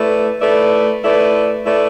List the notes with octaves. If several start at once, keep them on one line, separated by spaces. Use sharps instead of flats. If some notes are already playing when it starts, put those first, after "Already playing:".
Already playing: A3 E4 B4 D5
A3 E4 B4 D5
A3 E4 B4 D5
A3 E4 B4 D5